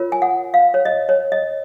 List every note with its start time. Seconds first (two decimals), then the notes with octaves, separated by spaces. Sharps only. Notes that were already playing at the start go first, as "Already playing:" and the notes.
Already playing: F4 A#4 C#5
0.12 G#5
0.22 F#5
0.54 F5
0.74 C#5
0.85 D#5
1.09 C#5
1.32 D#5